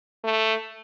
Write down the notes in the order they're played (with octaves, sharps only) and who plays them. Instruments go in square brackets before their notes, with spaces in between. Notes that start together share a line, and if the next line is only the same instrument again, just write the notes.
[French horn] A3